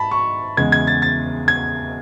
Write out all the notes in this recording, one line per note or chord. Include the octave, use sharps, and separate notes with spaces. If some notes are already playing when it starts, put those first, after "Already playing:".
Already playing: G#2 A5 B5
C#6
E2 C#3 G#3 G#6
G#6
A6
A6
G#6